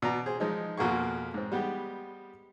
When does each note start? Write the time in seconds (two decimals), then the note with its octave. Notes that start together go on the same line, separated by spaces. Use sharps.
0.02 B2 D5 A#5
0.26 G#4 C5
0.40 F3 G#3 D#4
0.77 F2 B2 A#3 F#4 G#4 C#6
1.34 G#2 C4
1.52 G3 G#3 B3 G4